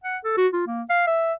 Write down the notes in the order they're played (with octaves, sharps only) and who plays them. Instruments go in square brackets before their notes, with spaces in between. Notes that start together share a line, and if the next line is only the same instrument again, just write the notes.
[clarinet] F#5
A4
F#4
F4
A#3
F5
E5